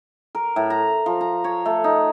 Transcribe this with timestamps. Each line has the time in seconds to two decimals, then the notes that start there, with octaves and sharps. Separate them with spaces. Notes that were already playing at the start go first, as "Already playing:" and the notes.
0.35 A#4
0.56 A2
0.70 A#5
1.06 F3
1.21 A#5
1.44 C#5
1.66 A3
1.84 D#4